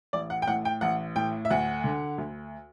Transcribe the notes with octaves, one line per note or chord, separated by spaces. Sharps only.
A1 D5
F#5
G5
A2 F#5
G5
A1 F#5
A2 G5
E5
D2 F#5
D3
D2